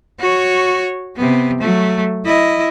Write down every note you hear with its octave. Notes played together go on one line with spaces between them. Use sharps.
F#4 C#5
C3 B3
F#3 A3
E4 D#5